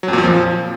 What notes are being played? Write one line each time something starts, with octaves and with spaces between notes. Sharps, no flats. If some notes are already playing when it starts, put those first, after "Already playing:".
F#3
F2
A#2
F2
F3